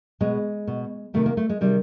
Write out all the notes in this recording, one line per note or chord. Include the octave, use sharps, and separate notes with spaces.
B2 G#3
B2
C3 D#3 A3
A#3
A3
G#3
C3 D#3 G3